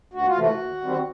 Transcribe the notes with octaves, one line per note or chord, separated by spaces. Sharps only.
D2 F#4
F4
C3 E3 A3 F#4
D#2
D#3 G3 C4